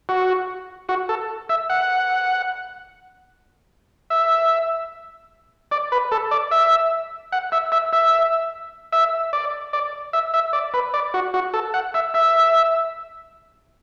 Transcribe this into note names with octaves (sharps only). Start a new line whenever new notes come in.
F#4
F#4
A4
E5
F#5
E5
D5
B4
A4
D5
E5
F#5
E5
E5
E5
E5
D5
D5
E5
E5
D5
B4
D5
F#4
F#4
A4
F#5
E5
E5